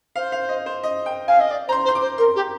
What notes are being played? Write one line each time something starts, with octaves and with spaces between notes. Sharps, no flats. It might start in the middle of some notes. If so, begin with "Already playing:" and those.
C5 F5
F5
D#5
C5
D#5
G5
F5 G#5
D#5
D5
C5 A#5
C6
C5
C6
D6
C5
A#4 C6
G4